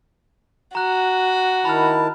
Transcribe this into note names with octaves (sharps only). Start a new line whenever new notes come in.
F#4 A#5 F#6
D#3 E4 A5 B5 F6